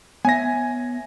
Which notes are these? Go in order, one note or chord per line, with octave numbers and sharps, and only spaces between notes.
B3 C#5 E5 G#5 A#6